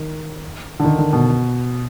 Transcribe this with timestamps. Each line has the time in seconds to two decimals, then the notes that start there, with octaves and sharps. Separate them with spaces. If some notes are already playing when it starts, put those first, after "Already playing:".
Already playing: D#3
0.80 D3
0.85 D#3
0.98 D3
1.13 B2